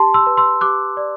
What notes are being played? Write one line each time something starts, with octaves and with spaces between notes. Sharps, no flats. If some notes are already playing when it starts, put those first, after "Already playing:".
Already playing: G4 A5 C6
C6 E6
B4
C6 E6
G4 D6 F#6
D5